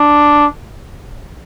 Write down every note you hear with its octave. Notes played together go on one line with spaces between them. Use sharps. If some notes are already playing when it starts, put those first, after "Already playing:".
Already playing: D4